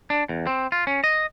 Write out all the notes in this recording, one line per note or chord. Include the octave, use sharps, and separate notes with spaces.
D4
E2
C4
F4
C#4
D#5